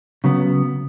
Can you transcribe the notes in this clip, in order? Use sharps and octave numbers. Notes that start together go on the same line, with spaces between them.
C#3 F#3 B3